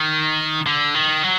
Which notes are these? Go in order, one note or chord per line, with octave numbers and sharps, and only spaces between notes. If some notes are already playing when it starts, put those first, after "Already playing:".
Already playing: D#3
D3
D#3
F#3